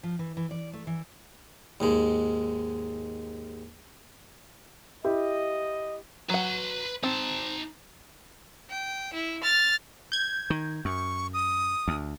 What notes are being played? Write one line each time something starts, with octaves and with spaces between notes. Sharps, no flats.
F3
E3
E3
D5
A3
E3
D#2 G#2 G#3
E4 G4 D#5
F#3 B4 F#5 C6
C4 D#4 A5
G5
E4
F6 A6
G6 G#6
D#3
F#2 C#6
D#6
D2